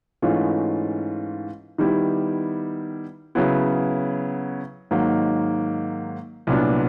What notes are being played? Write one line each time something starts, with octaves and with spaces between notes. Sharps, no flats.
G#2 E3 A3 C#4 F4
D#3 G3 B3 E4 G4
C#3 F#3 B3 E4
G#2 D#3 F#3 A#3
C2 A#2 F#3 B3 D4